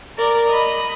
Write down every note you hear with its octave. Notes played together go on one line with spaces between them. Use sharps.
A#4 D5
D#5 B5